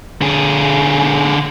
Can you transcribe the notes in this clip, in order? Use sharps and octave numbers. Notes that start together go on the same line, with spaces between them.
D3 G#4